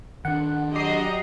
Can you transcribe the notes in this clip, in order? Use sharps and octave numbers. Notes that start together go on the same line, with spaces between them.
D#3 D4 F#5
F#3 F#4 G4 D5 D#5 A#5 C7